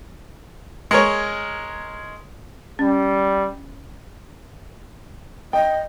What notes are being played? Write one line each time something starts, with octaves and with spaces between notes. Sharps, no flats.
G#3 A#4 C#5
G3 C#4
D#5 G5